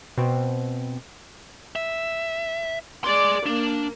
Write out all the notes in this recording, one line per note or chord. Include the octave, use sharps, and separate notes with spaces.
B2 C4
E5
G#4 D5 C6
A#3 D4